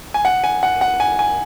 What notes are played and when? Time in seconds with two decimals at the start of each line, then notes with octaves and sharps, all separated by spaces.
0.14 G#5
0.25 F#5
0.44 G#5
0.63 F#5
0.81 F#5
1.00 G#5
1.19 G#5